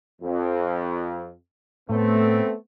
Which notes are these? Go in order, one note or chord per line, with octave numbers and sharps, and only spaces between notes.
F2
A2 A3 B3 C4